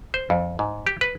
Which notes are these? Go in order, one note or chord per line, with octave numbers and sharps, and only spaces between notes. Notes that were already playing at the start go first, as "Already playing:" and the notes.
C5
F2
G#2
G4
B4